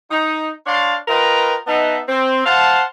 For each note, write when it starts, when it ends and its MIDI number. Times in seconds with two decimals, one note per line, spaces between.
0.11 0.49 63
0.67 0.95 62
0.67 0.95 73
0.67 0.95 77
0.67 0.95 81
0.67 0.95 84
1.08 1.56 65
1.08 1.56 70
1.08 1.56 71
1.08 1.56 75
1.08 1.56 79
1.08 1.56 82
1.67 1.99 59
1.67 1.99 63
1.67 1.99 75
1.67 1.99 76
1.67 1.99 78
1.67 1.99 81
2.09 2.44 60
2.46 2.83 72
2.46 2.83 77
2.46 2.83 78
2.46 2.83 81